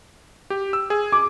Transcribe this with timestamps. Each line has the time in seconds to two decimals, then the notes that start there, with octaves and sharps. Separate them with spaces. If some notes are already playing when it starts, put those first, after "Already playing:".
0.50 G4
0.73 E6
0.90 G#4
1.12 D6